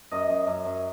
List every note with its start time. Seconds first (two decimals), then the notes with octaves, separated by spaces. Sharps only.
0.11 F#2 D#5
0.29 F#2
0.47 F#2
0.65 F#2